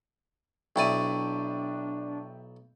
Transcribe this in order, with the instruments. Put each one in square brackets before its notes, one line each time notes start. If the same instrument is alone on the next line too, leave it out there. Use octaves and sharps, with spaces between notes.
[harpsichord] B1 E4 D5 [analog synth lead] D4 [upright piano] E5 G5 [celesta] C#6 D#7